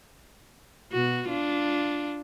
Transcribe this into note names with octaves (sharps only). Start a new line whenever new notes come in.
B2 F#4
D4 F4